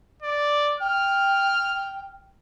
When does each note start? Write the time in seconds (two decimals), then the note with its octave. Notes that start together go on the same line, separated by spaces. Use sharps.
0.22 D5
0.80 G5 F6